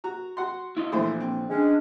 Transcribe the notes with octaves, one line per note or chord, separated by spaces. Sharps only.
F#4 A#5
F#4 F#5 C6
E4 F4 D#5
A#2 D3 E3 F3 A3 C5
C4
G#3 C#4 D4